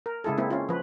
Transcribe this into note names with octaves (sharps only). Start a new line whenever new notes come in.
A#4
C#3 G#3 E4 G#4 A4
G#3 A#3 C4 E4
C#4 F4
F3 B4